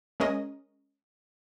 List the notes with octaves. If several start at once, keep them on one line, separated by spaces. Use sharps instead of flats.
G#3 C#4 A#4 D#5